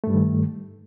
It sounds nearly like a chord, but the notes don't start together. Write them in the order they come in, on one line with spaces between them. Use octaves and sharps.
A3 G2 G3 D#3